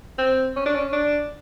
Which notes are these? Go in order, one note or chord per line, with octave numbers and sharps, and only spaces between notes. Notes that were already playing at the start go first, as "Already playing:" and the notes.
C4
C#4
D4
C#4
D4